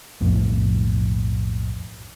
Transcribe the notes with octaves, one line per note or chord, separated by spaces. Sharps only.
B1 F2 A2